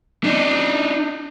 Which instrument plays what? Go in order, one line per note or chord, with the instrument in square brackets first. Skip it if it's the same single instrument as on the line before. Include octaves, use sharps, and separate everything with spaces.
[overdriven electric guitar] D4 D#4